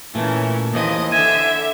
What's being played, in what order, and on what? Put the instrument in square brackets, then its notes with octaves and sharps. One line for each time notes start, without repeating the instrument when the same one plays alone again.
[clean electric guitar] A#2 A3 [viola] E3 C#4
[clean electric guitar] D#2 E3 F3 [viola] D#5
[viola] D3 E5 [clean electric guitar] G#5